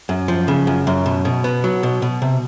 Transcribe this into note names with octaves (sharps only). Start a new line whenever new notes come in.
F#2
F3
C#3
F#2
F#2
B2
B2
B3
F#3
B2
B2
C3